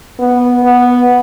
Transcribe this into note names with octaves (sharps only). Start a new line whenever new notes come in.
B3
B3